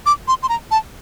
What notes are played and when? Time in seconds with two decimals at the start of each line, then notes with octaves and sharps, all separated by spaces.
0.06 D6
0.28 C6
0.43 C6
0.49 A#5
0.71 A5